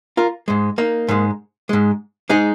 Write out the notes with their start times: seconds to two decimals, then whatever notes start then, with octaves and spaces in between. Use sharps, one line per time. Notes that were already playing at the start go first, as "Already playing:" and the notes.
0.17 F4 A#4
0.48 G#2 G#3
0.78 A#3 D#4
1.09 G#2 G#3
1.69 G#2 G#3
2.29 G#3 D#4 G#4